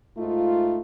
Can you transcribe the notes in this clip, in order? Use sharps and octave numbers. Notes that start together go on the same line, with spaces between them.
G#2 A3 D#4 F4